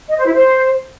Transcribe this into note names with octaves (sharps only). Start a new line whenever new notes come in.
D#5
C5
E4
C5